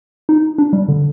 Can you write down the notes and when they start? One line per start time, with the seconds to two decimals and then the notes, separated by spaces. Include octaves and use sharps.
0.29 D#4
0.58 D4
0.73 G3
0.88 D3